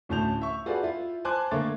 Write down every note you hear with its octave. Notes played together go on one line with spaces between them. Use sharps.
D2 A2 C#4 A5 G6 F7
E5 C#6
F4 F#4 G#4 A4 B4 D5
E4 F4
C5 G#5 A5 C6 D6 F#6
D3 A3 A#3 C#5 D6 A6